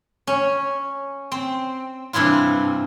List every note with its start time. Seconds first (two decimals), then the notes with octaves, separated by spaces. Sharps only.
0.27 C#4
1.32 C4
2.13 G2 C3 E3 E4 F4